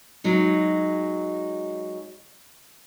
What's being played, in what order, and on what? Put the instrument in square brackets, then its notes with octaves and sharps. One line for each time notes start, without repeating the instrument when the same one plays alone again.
[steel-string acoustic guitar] F#3 G#3 D#4